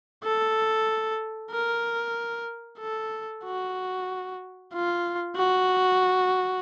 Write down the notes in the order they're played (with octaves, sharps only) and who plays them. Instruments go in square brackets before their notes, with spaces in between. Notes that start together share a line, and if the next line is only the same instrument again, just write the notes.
[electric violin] A4
A#4
A4
F#4
F4
F#4